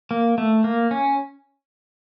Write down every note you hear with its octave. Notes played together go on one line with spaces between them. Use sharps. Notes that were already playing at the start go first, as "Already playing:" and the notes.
A#3
A3
A#3
C#4